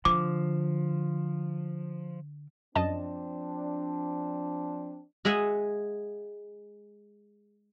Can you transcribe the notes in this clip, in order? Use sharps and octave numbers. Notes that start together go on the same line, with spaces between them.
D3 F3 D6
F#2 F3 C4 D4 D#5 A5
G#3 G#4 E5 F#5 G#5